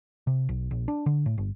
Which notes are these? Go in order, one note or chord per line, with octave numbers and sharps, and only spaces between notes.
C3
B1
A#1
D4
D3
A2
G1